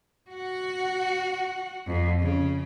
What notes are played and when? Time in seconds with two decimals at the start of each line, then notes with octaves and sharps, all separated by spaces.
0.31 F#4 F#5
1.87 F2
2.21 C#3